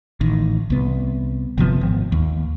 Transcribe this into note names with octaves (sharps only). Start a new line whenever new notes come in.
A1 D#3
C2 B3
G1 C3 F3 B3
G#1
D#2